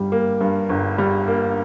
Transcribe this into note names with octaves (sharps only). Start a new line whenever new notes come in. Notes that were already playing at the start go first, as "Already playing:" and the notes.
Already playing: G1 G3
A#3
G2
G1
G3
A#3